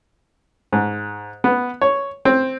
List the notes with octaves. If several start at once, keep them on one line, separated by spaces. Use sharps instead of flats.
G#2
B3
C#5
C4